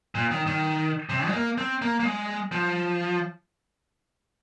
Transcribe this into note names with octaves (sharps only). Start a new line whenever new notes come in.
A#2
D#3
D#3
C3
G#3
A#3
C4
A#3
A#3
G#3
F3